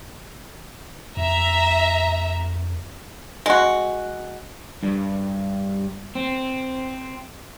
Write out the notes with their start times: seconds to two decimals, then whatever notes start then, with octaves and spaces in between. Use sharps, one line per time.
1.17 F2 E5 A#5
3.46 G#3 F#4
4.83 G2
6.15 C4